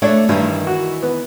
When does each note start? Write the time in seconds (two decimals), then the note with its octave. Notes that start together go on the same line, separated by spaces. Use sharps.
0.02 A3 D4 E4 C#5 D5
0.29 G2 D#3 E3
0.67 F#4
1.03 B3